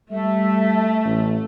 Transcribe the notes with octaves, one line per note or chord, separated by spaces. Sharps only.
G3 A3 A4 E5
A1